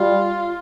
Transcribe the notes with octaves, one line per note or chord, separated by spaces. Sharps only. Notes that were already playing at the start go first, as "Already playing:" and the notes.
Already playing: G3 F4